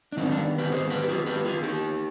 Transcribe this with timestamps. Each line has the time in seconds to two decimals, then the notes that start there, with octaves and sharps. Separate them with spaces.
0.12 D4
0.17 D#3 B3 C4 D#4
0.31 D4
0.58 G4 B4
0.72 G#4 C5
0.90 G4 B4
1.03 G4
1.09 F4 G#4
1.26 G4 B4
1.45 F4 G#4
1.63 D#4 G4